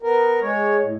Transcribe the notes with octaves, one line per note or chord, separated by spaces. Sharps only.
B3 A#4
G#3 C#5
A2